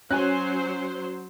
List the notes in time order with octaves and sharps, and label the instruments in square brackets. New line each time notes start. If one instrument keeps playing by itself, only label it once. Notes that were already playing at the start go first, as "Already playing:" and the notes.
[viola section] F#3 C5 [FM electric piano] C#4 [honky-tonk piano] C#5 G#5 F#6